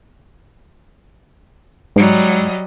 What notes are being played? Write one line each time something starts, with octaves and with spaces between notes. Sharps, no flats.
G#2 F#3 G3 D#5